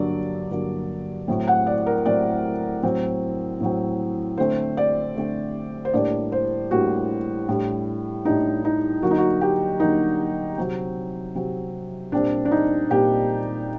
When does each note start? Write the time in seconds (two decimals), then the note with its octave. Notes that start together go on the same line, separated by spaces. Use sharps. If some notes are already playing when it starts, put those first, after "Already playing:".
Already playing: G2 D3 F#3 A#3 D4 D5
0.51 G2 D3 F#3 A#3 D4
1.28 A2 F#3 A3 C4
1.48 F#5
1.67 D5
1.86 A#4
2.06 A2 F#3 A3 C4 D5
2.83 A2 F#3 C4
3.61 A2 F#3 C4
4.37 D3 A3 C4 C5
4.77 D5
5.16 D3 A3 C4
5.85 C5
5.94 A2 G3 A#3 D4 D5
6.32 C5
6.71 A2 G3 A#3 D4 F#4
7.48 A2 G3 D4
8.25 A2 G3 D4 D#4
8.65 D#4
9.02 D3 F#3 A#3 F#4
9.11 D#4
9.18 F#4
9.41 G4
9.80 D3 F#3 A#3 D#4
10.58 C3 F#3 C4
11.35 C3 F#3 C4
12.12 A#2 G3 C4 D4
12.45 D4
12.51 D#4
12.90 A#2 G3 C4 G4